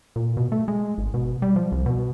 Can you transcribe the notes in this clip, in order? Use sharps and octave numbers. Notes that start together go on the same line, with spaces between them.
A#2
B2
A3
G#3
G#1
B2
G3
F3
C2
B2